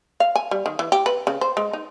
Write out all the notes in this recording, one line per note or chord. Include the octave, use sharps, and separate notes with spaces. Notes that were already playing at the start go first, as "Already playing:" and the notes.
F5
G#5
G3
D#3
E3
G4
B4
C#3
C5
G#3
D#4